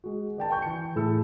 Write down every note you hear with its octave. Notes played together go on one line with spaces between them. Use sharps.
G#3 F#4
D#3 D5 G5 A5
G5 G#5 C#6 G6
E3 C#7
A2 E3 E4 G#4 A5 E6